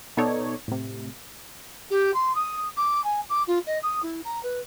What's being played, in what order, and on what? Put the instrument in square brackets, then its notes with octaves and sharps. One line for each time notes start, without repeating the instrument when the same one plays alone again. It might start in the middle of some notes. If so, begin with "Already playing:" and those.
[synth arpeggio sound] B2 B3 D#4 A4 C#5 D5
A2 C3
[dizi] G4
C6
D#6
D6
G#5
D6
F4
D#5
D#6
E4
A#5
B4